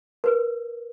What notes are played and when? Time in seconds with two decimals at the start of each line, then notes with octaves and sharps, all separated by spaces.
0.24 A#4 B4